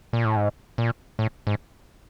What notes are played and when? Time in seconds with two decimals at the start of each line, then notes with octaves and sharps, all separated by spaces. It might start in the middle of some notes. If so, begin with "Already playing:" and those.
0.13 A#2
0.25 A2
0.36 G#2
0.78 A#2
1.19 A2
1.47 G#2